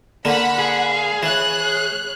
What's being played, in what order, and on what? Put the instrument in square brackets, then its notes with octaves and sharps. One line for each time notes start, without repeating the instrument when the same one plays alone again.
[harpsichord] D3 A#3 [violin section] F#5 B5
[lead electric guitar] G#4
[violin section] F5
[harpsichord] E3 [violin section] C#5 F#6